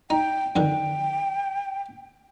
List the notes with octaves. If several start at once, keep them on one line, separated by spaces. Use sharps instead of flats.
D#4 G5
F2 D3 D#3 G5